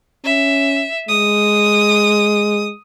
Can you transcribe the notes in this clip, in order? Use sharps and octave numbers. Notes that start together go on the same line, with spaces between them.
C#4 E5
G#3 D#6